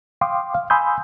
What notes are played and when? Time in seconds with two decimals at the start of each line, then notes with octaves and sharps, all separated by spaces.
0.21 F5 G5 C6 D6 D#6
0.54 F5
0.70 G#5 B5 C6 D#6 E6 G6